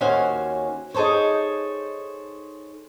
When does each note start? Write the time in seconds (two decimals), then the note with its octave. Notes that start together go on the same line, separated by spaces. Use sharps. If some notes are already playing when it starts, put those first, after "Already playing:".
0.01 D#2 C#4 F#4 C5 F5 G#5
0.94 D#4 G#4 A4 C5 C#5